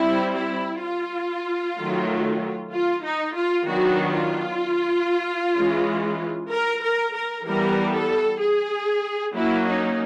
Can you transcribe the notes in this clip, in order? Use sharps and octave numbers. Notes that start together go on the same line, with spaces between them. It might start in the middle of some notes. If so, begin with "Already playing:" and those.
Already playing: G3 C4 E4
E4
F4
D#3 F#3 A3
F4
D#4
F4
D#3 F#3 B3 D4 F#4
F4
E3 G#3 C#4
A#4
A#4
A#4
E3 G3 B3 A#4
A4
G#4
F#3 A#3 C#4 E4
D#4